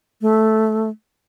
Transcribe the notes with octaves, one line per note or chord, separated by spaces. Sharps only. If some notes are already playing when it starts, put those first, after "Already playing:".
A3